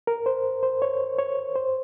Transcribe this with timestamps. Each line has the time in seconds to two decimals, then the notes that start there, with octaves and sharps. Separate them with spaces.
0.07 A#4
0.26 C5
0.63 C5
0.82 C#5
1.18 C#5
1.56 C5